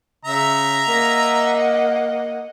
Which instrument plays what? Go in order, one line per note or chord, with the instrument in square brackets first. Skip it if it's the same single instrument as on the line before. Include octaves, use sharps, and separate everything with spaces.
[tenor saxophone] C#3 [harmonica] E5 A#5
[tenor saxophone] A#3 [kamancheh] D#5 F#5